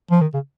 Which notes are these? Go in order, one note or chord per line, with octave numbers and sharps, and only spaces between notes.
F3
D#3
C#3